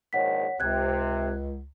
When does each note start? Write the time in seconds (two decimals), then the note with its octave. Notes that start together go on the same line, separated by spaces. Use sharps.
0.13 A#1 G#2 D#3 C#5 F#5 B6
0.60 C#2 C3 F#6 G#6